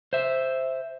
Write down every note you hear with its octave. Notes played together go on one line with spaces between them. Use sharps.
C5 E5